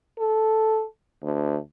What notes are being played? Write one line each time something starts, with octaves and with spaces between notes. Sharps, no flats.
A4
D2